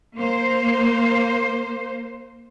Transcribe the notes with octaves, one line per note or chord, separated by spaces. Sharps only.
A#3 C5